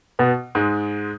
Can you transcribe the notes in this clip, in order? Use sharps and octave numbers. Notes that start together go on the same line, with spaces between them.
B2 B3
G#2 G#3